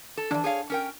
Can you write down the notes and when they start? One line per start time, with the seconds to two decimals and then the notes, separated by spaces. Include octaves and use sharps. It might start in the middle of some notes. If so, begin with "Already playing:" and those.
0.17 A4
0.31 D#3 E3 D4
0.44 G#4 C#5 F5
0.70 C#4 A#4 G5